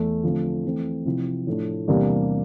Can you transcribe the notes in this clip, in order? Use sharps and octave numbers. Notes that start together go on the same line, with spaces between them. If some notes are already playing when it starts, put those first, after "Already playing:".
Already playing: E2 A3
D3 F3 A3 C4
E3 A3 C4
C3 F3 C4 E4
A2 F3 A3 D4
E2 C3 G3 A#3 D4